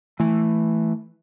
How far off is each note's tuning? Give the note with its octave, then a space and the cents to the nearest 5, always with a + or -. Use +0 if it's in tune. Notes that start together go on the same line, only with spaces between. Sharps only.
E3 +0 A3 +0